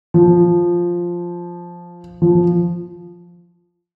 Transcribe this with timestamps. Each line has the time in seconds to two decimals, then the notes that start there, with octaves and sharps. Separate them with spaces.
0.14 F3
2.22 F3